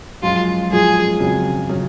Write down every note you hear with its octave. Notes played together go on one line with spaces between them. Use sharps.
F#2 F3 G#3 F4
F#2 F3 G#3 G#4
F2 C#3 F#3
C#3 F#3